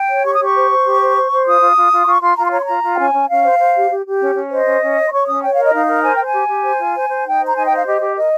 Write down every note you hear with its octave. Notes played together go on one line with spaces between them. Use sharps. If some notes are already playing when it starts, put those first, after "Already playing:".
Already playing: G5
C#5
G4 C#6
D#6
G4 C#6
C5
C5
G4
C5
C5
C5
F4 D#6
F4
F4
F4
C6
F4 C#6
F4 C6
F4 A#5
C6
C#5 A#5
C6
F4 A#5
F4
G5
C#4 G#5
C#4
C#4 F5
C5
C5
G4
G4
G4
C#4
C#4
C5 D#5
C#4
C#4
C#5
C6
C#5 C#6
C#4 D#6
C#5 G5
A#4 F5
D#5
D#4 F5
A#4
C5 G#5
C5 G5
G#5
G4
G4
C5
F4
C5
C5
D#4 G5
C5
A#5
D#4 G#5
G5
C5 F5
G4 D#5
G4
A#4 D#5